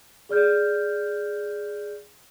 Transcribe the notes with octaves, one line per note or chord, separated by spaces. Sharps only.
G#4 D5 F6 G6